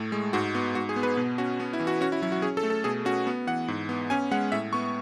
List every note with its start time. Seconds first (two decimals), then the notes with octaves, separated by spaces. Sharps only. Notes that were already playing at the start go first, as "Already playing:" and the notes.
Already playing: A2 A3
0.12 G#3
0.33 G#2 F#4
0.55 B3 F#4
0.75 G#2 F#4
0.89 G#4
0.96 B3
1.03 B4
1.17 B2
1.38 C#4 F#4
1.60 B3
1.73 E4
1.80 E3
1.87 F#4
2.01 C#4 F#4
2.12 E4
2.22 F#3 E4
2.32 F#4
2.42 C#4 G#4
2.57 A4
2.63 A3
2.70 A4
2.84 B2 G#4
3.05 C#4 F#4
3.27 B3
3.47 E3 F#5
3.68 G#2
3.89 B3
4.10 C#4 G#5
4.31 G#3 F#5
4.52 A2 E5
4.73 B3 C#6